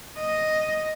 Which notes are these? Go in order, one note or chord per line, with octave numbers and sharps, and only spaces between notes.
D#5